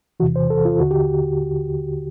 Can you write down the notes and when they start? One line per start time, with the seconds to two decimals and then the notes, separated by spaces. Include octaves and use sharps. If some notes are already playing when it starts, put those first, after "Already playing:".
0.20 E2 C3 E3 F#4
0.36 C5
0.50 A4
0.65 F4
0.80 D#2 D3 F#4
0.91 G4